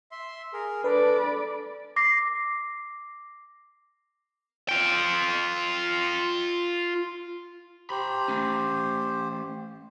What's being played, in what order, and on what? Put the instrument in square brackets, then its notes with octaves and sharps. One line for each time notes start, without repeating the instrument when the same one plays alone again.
[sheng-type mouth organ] E5 C6
G#4 A#4
[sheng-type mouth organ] D4 [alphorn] A4 [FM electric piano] B4 [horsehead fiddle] D5 B5
[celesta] D6 A#6 C7
[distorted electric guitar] F4 G5
[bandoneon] G4 C5 [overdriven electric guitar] A#5 B5
[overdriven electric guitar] A3 C#4